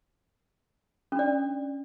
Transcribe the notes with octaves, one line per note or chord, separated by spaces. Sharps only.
C#4 D4 D5